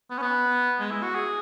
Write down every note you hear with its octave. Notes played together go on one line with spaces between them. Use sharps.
B3
C#4
B3
G#3
E4
F#4
G#4